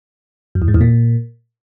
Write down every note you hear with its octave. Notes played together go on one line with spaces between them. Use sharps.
F#2
E2
G#2
E2
A#2